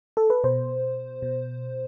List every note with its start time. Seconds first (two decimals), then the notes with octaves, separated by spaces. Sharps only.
0.17 A4
0.30 B4
0.44 B2 C5
1.22 B2